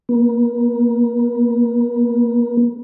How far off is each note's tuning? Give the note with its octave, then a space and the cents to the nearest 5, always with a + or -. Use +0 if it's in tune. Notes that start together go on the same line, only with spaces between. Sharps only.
A#3 +45